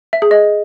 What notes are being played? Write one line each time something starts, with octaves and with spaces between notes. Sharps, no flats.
E5
G#4
D#5